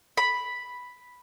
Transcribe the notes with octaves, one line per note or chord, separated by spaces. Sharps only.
B5